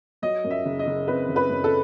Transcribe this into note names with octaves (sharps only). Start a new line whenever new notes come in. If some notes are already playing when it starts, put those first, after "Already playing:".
F#3 D#5
F#2
E5
F#1
D#5
F#1
C4 B4
F#1
B4
F#2
A4